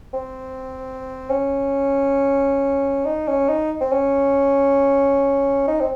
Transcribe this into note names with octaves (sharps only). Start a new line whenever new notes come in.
C4
C#4
D#4
C#4
D#4
C4
C#4
D#4
C4